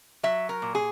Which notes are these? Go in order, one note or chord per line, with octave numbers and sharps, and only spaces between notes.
F#3 E5
A#4
A#2
G#4